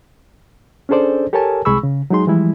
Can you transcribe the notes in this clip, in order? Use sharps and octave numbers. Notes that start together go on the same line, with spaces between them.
C#4 D4 G#4 A4 C5 D5
G4 A4 A#4 C#5 G#5 A5
C2 G#3 G#4 B5 C#6 E6
C#3
F#3 G#3 D#4 G#4 C6
E3 F3 G3 G#3 E4